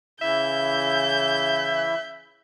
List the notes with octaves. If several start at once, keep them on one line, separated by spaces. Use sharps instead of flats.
C#3 E3 E4 E5 G6